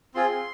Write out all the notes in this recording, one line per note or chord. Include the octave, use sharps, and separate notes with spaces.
C4 F4 G#4 C6